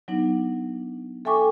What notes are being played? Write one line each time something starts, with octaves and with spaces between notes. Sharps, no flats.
F#3 B3 D4 D#4
A4 E5 G5 G#5 C#6 D6